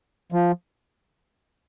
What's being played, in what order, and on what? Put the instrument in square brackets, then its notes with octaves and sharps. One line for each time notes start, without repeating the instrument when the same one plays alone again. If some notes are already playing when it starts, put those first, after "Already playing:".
[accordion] F3